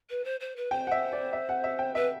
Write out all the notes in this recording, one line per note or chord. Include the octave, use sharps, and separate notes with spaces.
B4
C5
C5
B4
C5 G5
F#5
E5
D5
E5
F#5
E5
G5
B4 E5